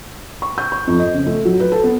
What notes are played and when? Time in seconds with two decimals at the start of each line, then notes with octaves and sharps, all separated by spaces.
0.42 C#6
0.58 G6
0.72 C#6
0.87 F2
1.00 D#5
1.14 C#3
1.27 A3
1.45 F#3
1.60 B4
1.72 A4
1.83 B3